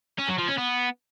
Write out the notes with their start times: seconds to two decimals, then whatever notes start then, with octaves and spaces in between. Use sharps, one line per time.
0.18 C#4
0.28 F#3
0.38 F3
0.48 C#4
0.58 B3